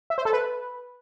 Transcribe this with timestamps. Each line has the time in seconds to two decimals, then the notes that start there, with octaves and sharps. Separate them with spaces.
0.10 E5
0.18 C5
0.25 A4
0.33 B4